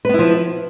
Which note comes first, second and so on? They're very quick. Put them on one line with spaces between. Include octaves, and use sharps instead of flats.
B4 B3 E4 F3